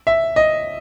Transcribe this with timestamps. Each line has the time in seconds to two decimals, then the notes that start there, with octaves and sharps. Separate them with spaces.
0.07 E5
0.36 D#5